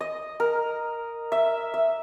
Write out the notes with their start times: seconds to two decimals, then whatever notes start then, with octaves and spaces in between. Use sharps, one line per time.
0.01 D#5
0.40 A#4
1.32 E5
1.74 E5